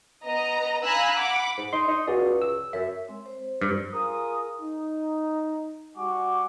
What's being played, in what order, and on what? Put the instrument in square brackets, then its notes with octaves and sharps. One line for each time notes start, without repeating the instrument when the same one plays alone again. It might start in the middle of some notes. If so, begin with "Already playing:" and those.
[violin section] B3 D#5 A#5
F5 G#5 A#5 B5 E6 F#6
F#5 B5 D6
[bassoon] G#2
[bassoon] D#4 [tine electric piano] C6
[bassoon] D#4
[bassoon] C#2 [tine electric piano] F#4 G#4 D5
[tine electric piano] E6
[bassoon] F#2 [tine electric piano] E5
[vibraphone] G#3 C4 C#5
C5
[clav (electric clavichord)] G2
[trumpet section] F4 G#4 A#4 D#6
D#4
G3 F#4 F#5 G#5 C#6 D6